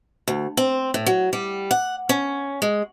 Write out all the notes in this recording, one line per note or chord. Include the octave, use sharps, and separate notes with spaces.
D2
C4
A2
F#3
G3
F#5
C#4
G#3